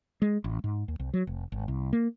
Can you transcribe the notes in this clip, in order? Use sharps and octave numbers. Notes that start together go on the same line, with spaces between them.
G#3
A1
G#2
D#2
C2
F#3
F1
G#1
C2
A#3